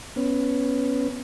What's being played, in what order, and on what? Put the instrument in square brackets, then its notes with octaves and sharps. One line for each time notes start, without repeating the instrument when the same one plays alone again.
[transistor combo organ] B3 C#4